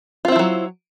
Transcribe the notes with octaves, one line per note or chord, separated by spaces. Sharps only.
F3 F#3 C4 E4 F4